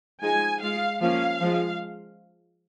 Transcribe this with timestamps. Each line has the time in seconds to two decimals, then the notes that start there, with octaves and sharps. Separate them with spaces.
0.22 F3 G#3 D#4 G#5
0.61 G#3 F4 F5
1.01 F3 A#3 C#4 F5
1.40 F3 G#3 F4